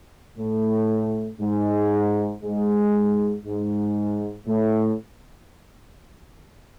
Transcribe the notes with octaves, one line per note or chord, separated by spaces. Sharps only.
A2 A3
G#2 G#3
G#2 G#3
G#2 G#3
A2 A3